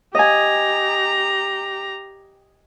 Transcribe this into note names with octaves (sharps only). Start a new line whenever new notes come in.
G4 D#5 G#5 A#5